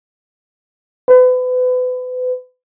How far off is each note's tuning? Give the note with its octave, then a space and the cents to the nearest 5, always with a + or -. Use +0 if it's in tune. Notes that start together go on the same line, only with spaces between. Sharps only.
B4 +35